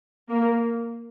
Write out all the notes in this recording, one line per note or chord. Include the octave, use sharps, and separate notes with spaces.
A#3